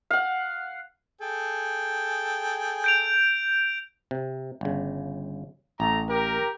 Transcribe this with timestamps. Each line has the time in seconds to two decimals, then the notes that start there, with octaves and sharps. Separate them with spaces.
0.10 F5 F#5
1.21 G#4 A4 G5
2.84 G6 D7 F7
4.11 C3
4.61 G1 C#3
5.80 A1 A3 A4 A#5
6.09 G4 A#4